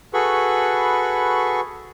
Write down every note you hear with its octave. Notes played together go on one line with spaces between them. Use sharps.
F#4 G#4 A4 B4 B5 C#6